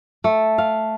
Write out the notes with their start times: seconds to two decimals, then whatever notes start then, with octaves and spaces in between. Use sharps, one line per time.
0.24 A3
0.58 F5